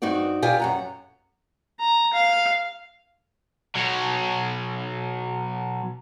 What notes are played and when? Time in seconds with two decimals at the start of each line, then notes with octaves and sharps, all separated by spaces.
0.02 G2 C4 D#4 F#4 D5
0.42 B2 F4 G4 D5 G#5
0.60 F#2 F#5 A#5
1.80 A#5
2.13 F5
3.75 B2 F#3